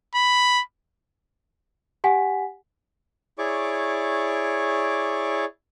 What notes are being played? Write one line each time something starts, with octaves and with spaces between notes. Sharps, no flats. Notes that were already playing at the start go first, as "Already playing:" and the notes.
B5
G4 F#5 G#5 B6
E4 G#4 C#5 D5 C#6 D6